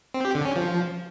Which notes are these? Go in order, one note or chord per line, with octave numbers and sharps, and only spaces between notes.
C4
G4
D3
C#4
F3